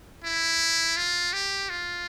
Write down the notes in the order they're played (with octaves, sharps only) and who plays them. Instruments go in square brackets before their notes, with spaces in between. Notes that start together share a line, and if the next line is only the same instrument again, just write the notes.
[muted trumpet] E4
F4
G4
F4